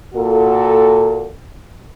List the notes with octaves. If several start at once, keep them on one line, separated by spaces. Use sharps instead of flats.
A#2 F#4 A4